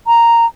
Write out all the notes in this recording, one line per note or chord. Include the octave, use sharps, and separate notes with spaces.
A#5